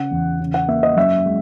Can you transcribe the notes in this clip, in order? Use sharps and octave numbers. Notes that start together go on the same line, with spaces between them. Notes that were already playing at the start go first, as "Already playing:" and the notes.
Already playing: C#3 F#5
E2
C#3
F#5
A#3 E5
D#5
F#2 E5
G#3